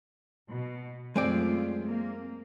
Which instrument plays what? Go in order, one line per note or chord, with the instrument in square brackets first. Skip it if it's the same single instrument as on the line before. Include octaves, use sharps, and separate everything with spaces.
[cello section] B2
[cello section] F#2 A3 F4 [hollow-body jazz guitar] G#3 C4 D5
[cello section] A#3